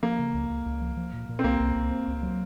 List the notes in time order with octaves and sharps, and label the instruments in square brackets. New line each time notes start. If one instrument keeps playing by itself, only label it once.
[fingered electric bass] F3 [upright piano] A#3
[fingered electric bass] C#3
C#2
C#2
C#2
F3
F3
A#2
A#2
[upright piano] C4
[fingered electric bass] C2 [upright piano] A#3
[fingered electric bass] C2
C2
C4
C#2
F#3